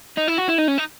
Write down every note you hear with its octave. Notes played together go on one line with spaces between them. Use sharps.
D#4
E4
F#4
E4
D#4
C#4
D#4